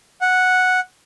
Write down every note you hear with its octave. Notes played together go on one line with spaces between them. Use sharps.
F#5